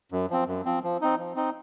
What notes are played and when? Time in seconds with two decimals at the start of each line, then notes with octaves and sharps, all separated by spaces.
0.12 F#2
0.30 F3 C4
0.47 F#2
0.65 F3 C4
0.83 F3
1.01 C4 D#4
1.19 F3
1.36 C4 D#4